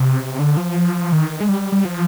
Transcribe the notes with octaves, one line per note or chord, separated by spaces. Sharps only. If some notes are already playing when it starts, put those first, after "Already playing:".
Already playing: C3
D3
F3
D#3
G#3
G3
G3
F3